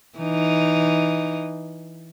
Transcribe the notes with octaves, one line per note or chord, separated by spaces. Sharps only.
E3 D#4